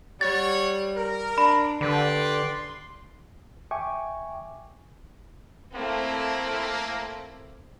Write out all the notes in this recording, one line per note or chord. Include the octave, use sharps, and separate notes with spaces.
G3 C#5 F#5 A6
A#4
D4 B5
D3 G4 B4 D5 C6
E5 G5 G#5 C#6 D6
A3 A#3 C4 E4